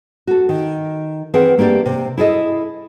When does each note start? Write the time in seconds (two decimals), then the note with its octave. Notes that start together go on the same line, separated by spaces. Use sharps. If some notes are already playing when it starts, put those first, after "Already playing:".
0.27 F#4 A4
0.49 D#3
1.34 E3 C4 G#4 A#4 F#5
1.58 A3 A#3 D4 G4 D5
1.86 C3
2.17 E4 G#4 A4 D#5